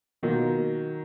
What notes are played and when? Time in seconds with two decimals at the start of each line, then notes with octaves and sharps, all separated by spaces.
0.22 B2 D#3 F#3 A#3 F4